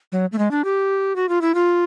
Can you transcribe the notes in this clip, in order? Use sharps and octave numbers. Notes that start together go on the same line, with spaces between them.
F#3
A3
G#3
D4
G4
F#4
F4
E4
F4